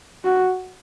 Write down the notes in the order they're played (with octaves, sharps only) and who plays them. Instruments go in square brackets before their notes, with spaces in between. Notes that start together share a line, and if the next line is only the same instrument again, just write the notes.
[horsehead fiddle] F#4